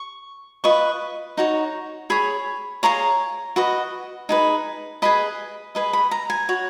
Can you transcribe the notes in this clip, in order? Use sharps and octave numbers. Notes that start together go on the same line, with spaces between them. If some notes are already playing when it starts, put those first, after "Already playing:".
Already playing: C#6
F4 B4 D#5 C#6
D#4 F#4 C#5
G#4 C#5 B5
F4 G#4 C#5 A#5
F#4 B4 D#5
D#4 G#4 B4
G#4 B4 D#5 B5
G#4 B4 D#5
B5
A#5
G#5
F#4 C#5